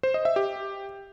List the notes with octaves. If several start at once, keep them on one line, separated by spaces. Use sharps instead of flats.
C5
D#5
E5
G4